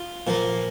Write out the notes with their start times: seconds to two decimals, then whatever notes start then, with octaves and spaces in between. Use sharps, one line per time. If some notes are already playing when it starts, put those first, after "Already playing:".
Already playing: F4
0.27 A#2 F3 A#3